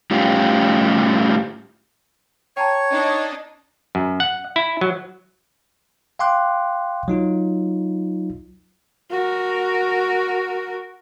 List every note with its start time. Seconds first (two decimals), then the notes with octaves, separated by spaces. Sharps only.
0.11 A2 G3 C#4 F4 G4
2.57 C#5 G5 A5 A#5 G#6
2.90 D4 D#4 D#5
3.95 F#2
4.20 F#5
4.56 E4
4.81 F#3
6.19 F5 G5 C6 D6 F#6
7.08 F#3 D#4 F4
9.11 F#4 A#4